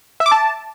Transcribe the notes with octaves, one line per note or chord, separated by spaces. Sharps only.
E5
D6
A5